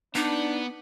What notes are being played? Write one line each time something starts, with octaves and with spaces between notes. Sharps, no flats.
B3 D4 D#4